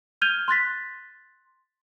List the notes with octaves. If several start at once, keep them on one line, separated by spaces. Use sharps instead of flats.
F6 G6 G#6 D#7 F7 G7
C6 F#6 A6 B6